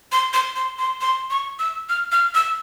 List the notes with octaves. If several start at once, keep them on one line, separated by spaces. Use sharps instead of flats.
C6
C6
C6
C6
C6
C#6
E6
F6
F6
E6